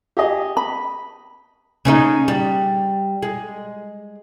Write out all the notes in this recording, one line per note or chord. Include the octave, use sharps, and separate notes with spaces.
G4 G#4 D#5
B5
C#3 C#4 D#4
G3
G#3